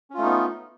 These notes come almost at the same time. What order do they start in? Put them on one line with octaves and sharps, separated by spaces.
C#4 F4 A3 D#4 B3